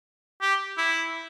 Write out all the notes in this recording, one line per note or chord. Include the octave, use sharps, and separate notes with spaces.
G4
E4